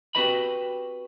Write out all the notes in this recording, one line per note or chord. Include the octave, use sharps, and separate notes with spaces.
C4 F#4 G4 B4 D#5 B5